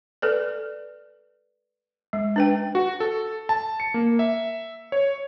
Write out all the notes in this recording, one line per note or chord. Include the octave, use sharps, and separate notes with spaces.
A4 B4 D5
G#3
D4 B4 G5
F#4
A4
A5
C#7
A#3
E5
C#5